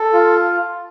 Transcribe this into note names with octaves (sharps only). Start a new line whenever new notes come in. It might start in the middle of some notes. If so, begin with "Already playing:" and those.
Already playing: A4
F4